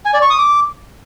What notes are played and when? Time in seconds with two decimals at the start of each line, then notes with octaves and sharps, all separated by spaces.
0.05 G#5
0.14 D5
0.22 C#6
0.30 D#6
0.38 D6